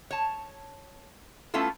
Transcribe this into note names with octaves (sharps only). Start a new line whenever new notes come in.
C#5 A5
A3 B3 C#4 E4 F4 A4